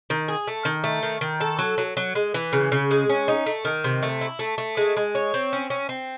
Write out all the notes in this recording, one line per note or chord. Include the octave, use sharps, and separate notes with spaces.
D#3
G#4
A3
D#3
A3
D#3
D#3
A4
F#3
F#3
F#3
G#3
E3
C#3
C#3
G#3
C#4
D#4
A3
D#3
C3
A3
E4
A3
A3
G#3
G#3
C#5
C4
C#4
C#4
C4